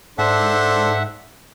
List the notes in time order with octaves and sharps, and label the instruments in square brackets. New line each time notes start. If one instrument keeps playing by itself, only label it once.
[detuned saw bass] G#2 [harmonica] D4 A4 C5 [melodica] E5 F#5